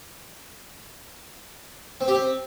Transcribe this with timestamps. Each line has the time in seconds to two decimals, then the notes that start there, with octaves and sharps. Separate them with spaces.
2.01 C4
2.08 G4
2.15 C4